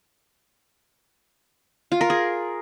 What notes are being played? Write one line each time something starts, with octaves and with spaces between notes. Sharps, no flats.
F4
A#4
G#4